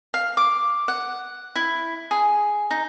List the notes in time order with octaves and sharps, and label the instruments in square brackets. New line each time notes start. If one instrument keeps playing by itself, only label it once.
[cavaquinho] F5
D6
F#5
E4
G#4
D#4